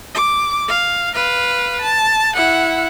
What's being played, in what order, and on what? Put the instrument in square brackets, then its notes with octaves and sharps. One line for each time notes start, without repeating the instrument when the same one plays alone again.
[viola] D6
F5
B4 F5
A5
E4 F#5